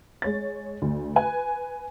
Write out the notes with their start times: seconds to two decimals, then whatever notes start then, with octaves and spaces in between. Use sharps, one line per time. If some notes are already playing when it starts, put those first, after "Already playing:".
0.22 G#3 C#5 A6
0.82 D2
1.16 B4 G#5